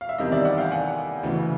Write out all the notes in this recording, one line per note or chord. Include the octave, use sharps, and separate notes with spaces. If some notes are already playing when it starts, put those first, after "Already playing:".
F5
E5
E2 C3 D#3 G3 D#5
D5 E5
E5 F#5
F5 G5
F#5 G#5
D2 C#3 E3